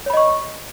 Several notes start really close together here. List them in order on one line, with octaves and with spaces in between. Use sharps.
C#5 B5 D#5 C#6